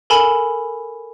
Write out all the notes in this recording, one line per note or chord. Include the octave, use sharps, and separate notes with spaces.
A4 A#4 G#5 B5 E7